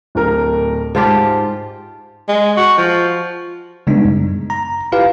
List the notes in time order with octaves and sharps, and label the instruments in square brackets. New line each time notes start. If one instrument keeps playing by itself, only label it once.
[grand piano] D1 A#4
[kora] G#2 F4 G4 [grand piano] C5 A5
[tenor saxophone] G#3
F#4
F3
[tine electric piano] C#3 G3 G#3 B3 D4 D#4
F#2
A#5
E4 F4 G4 B4 F5